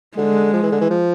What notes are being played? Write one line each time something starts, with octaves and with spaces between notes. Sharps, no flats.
D3 G#3
F3
E3
D3
E3
F3